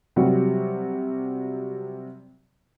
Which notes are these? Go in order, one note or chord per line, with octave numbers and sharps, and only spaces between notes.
C3 F#3 G3 F#4 G4